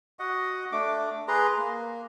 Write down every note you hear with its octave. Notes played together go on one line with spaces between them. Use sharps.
F#4 D#5 F#5
A3 D4 D6
G#4 B4 A#5 C6
A#3